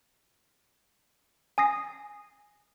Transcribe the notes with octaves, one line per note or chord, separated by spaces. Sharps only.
G#5 D#6 A#6 C7